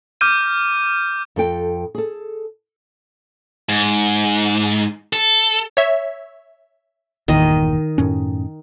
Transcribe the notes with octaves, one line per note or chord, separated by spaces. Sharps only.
D6 F6 G6 D#7
F2 A4 G5
G#4 A4
G#2
A4
C#5 E5
G1 E2 A#2 D#3 D#5
F#2 A2 C#4